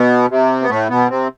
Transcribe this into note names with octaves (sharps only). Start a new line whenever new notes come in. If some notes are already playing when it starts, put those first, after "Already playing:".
Already playing: B2 B3
C3
B3
A2 A3
B2 B3
C3 C4